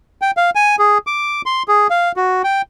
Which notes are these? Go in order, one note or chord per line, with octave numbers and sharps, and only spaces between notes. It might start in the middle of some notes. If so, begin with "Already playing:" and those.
G5
F5
G#5
G#4
D6
C6
G#4
F5
F#4
G5